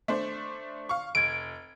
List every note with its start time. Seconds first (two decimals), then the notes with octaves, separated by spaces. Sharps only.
0.08 A3 D4 C5
0.89 F5 C#6
1.15 F1 G#6 D7